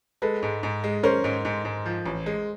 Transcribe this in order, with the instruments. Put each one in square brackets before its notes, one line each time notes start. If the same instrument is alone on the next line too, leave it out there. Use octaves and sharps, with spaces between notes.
[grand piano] G#3 [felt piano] A4 B4
[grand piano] G#2
G#2
G#3
[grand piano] C#4 [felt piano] A#4 C5
[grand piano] G#2
G#2
G#2
F3
A1
G#3